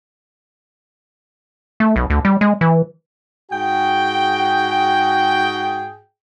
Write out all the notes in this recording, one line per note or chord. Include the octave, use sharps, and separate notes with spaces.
A3
B1
D2
G3
G#3
E3
G#2 F#4 G#4 G5